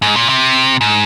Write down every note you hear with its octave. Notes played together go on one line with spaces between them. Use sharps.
G#2
A#2
C3
G#2